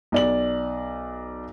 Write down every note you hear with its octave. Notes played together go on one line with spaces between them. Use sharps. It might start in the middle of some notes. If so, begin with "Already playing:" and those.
B1 D5 F#7